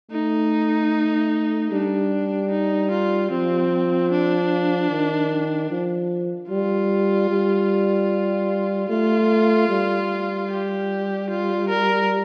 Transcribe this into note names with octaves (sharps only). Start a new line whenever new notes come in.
A3 D#4
G3 D4
D#4
F4
F3 C4
D4
D#3
F3
G3 F4
G3
A3 F4
G3
G4
F4
A#4